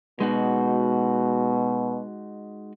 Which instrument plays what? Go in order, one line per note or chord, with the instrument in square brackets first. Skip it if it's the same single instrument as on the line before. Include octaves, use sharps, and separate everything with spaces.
[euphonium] B2 [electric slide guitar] G#3 D#4 F#4